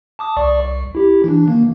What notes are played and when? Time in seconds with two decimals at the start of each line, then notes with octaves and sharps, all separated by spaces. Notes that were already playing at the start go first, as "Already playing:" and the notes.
0.19 A5 D6 D#6
0.37 C2 D5 C#6
0.60 C2
0.95 E4 G4
1.24 E3 D4
1.48 D#3 A#3